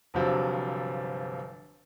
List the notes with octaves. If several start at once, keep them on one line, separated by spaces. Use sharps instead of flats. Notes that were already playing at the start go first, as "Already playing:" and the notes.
G1 G2 C3 F3 F#3